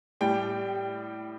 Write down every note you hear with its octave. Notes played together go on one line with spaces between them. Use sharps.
A2 G3 G5